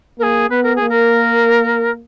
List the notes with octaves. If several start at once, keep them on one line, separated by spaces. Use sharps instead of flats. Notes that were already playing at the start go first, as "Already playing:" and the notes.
A#3 G#4 A#4
B3 B4
A#4
G#4
A#3
A#4